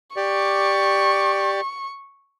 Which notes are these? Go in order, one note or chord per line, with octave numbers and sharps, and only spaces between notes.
G4 D5 C#6